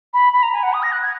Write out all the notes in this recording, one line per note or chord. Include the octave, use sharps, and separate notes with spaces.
B5
B5
A#5
G#5
F#5
D#6
A#6
F#6
G#6